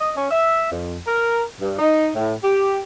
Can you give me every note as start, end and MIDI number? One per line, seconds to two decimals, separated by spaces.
0.01 0.11 75
0.16 0.30 61
0.31 0.69 76
0.72 0.98 41
1.07 1.42 70
1.60 1.77 43
1.79 2.09 63
2.16 2.35 45
2.44 2.80 67